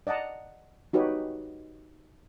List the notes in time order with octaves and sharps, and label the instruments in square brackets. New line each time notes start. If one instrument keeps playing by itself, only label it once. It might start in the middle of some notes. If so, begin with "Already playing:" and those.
[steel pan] D5 D#5 F#5 A5 A#5
D#4 F#4 G4 B4 C#5